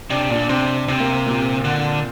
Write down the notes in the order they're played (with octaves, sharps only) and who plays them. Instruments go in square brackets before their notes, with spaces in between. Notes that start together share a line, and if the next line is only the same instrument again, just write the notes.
[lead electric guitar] C3 [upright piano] D4
[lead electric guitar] A#2 [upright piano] D4
[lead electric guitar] C3 [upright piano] C4
[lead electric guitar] C3 [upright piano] C4
[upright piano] A#3
A#2
[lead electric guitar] D3